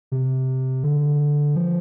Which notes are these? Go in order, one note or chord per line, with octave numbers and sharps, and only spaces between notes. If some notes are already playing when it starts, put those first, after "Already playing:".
C3
D3
F3